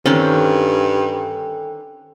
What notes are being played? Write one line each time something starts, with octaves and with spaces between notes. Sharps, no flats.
G2 D3 D#3 C4 C#4 A4 G5 G#5